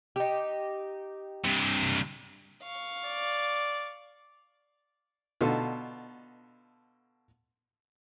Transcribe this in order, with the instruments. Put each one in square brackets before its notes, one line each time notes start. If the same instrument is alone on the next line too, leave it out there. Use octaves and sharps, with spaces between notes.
[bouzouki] D#4 G4
[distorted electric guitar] G2 C3
[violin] F5 C#6
[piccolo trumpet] D5
[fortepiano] B2 D3 D#4 F4 A4